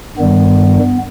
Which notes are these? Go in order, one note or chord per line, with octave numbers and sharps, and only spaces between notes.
G2 D#3 G3 B3